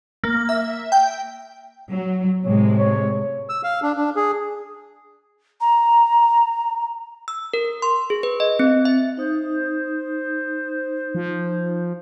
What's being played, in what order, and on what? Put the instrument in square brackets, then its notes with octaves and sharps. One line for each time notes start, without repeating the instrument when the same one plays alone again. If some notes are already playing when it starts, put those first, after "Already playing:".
[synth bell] A#3
E5
G5
[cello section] F#3
[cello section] A2 C3 G#3 [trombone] C#5
[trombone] C#5
[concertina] E6
F5
D4
D4
G#4
[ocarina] A#5
[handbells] E6
A#4
C6
G#4
B4
D#5
C4
E5
[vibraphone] D#4 D#6 [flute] C5
[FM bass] F3